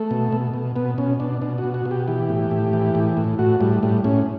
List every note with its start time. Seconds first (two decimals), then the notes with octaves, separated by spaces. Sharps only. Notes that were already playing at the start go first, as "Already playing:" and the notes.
Already playing: A3
0.11 B2
0.32 B2
0.54 B2
0.76 B2 B3
0.98 B2 C#4
1.20 B2 D4
1.41 B2 D4
1.58 F#4
1.64 B2
1.74 F#4
1.85 B2
1.91 G4
2.08 E3 G4
2.29 A2
2.51 A2
2.73 E3
2.95 A2
3.17 A2
3.39 A2 F#4
3.61 A2 G3
3.83 A2 G3
4.04 A2 C#4